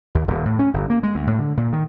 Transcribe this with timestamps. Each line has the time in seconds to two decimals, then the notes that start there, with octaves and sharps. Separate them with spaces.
0.15 D#2
0.28 D#1
0.45 A2
0.59 C#4
0.74 G1
0.90 A#3
1.03 G#3
1.15 D2
1.27 A2
1.39 D3
1.57 A#2
1.73 D#3